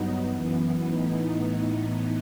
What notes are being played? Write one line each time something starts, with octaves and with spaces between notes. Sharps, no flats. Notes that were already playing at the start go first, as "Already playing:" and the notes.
Already playing: G2 F#3 B3 D#4
F#2 E3 B3
A2 E3 B3 D#4